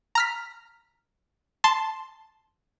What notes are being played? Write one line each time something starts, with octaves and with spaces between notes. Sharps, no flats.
A#5 F6 B6
A5 C6